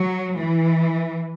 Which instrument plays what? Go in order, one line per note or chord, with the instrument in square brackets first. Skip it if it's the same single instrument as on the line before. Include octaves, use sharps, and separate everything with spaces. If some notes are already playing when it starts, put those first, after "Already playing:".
Already playing: [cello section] F#3
E3